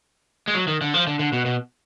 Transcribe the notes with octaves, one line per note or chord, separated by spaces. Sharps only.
G#3
F#3
D#3
D3
F3
D3
D3
B2
B2